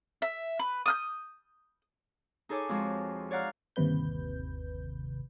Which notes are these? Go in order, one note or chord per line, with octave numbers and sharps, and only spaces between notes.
E5
B4
D#6 F6 G6
D#4 G#4 A4 C#5 G#5 D6
F2 F3 G#3 C4 F#4
C#5 D5 F5 F#5 A#5 F6
G1 D#2 C3 B4 G6